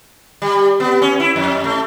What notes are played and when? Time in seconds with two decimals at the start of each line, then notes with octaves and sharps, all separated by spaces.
0.42 G3
0.80 B3
1.02 C#4
1.20 E4
1.36 F2
1.64 A3